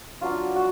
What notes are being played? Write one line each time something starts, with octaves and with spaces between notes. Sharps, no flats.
F#3 B3 D4 F4
F#4